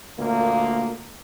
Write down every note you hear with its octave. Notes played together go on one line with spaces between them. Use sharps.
D2 A#2 A#3